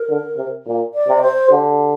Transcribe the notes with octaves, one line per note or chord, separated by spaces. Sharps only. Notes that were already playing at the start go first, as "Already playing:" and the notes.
Already playing: A#4
D3
C3
A#2
D5
C3
C5
D3 G4